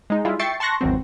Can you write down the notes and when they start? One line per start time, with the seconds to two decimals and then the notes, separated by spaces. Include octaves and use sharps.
0.10 G#3 D#4
0.25 G3 G#3 E4 F4
0.39 E5 G5 C#6 A6 C7 C#7
0.60 A5 C6 C#6 F#6 A#6
0.81 G#1 E2 F#3 C4